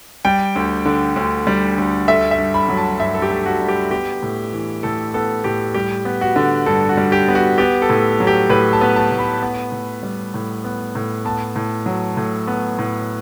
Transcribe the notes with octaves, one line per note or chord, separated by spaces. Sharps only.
G3 G5
D2
D3
D2
G3
D2
A3 E5
E5
G2
B5
F#3
A5
G2 E5
A4
G4
A3
F#4
G2
G4
B3 G4
A2
E3
A2 A4
B3 A4
A2 G4
G3 G4
B3
F#4
D3
G2 A4
F#4
G3
G4
B3
F#4
B3 G4
A4
A2
F#3
G4
A2 B4
A5
B3
A5
A2
B5
B3
A2
G3
A2
B3
A2
B3 A5
A2
F#3
A2
B3
A2